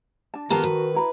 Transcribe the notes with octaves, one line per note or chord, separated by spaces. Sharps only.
D4 A5
D#3 A#3 B3 F4 G4 A4 A5 A#5
F#4 B4
E4 A#5 B5